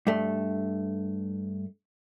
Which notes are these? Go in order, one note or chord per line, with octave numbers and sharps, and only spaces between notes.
G2 A3